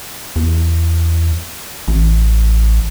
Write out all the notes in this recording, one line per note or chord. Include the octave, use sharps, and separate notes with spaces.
E2
A1